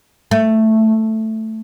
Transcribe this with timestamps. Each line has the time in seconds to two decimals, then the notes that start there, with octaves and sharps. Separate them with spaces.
0.31 A3